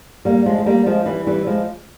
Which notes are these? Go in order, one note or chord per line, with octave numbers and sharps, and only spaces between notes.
G3 A#3
F3 G#3
G#3
G3 A#3
F3 G#3
E3 G3
E3 G3
F3 G#3